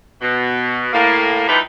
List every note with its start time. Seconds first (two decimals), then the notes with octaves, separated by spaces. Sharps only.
0.21 B2
0.93 A2 A#3
1.48 F3 G3 D#4 E4 G4 B4